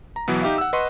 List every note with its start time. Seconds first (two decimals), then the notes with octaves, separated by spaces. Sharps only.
0.16 A#5
0.28 B2 E3 F#3 B3
0.42 D#4 G4 E5 F5
0.58 F#5 E6
0.73 B4 D#5 F#5 C6 C#6